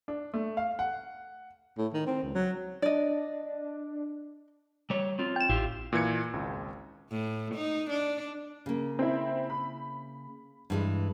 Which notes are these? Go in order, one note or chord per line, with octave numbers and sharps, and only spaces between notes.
D4
A3
F5
F#5
A2
D#3
C4
C#2
F#3
D4 D5 D#5
G3 C#5
C4 F4
G5 E7
A1 E4 F4 G4
A#2 E3 G#6 C#7
G#1 C#2
A2
D#4
D4
C#3 A#3
C4 E4
B5
G2 E3 G#3